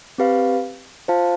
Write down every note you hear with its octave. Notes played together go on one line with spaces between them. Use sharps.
C4 G4 B4 F5
F4 C5 F5 A5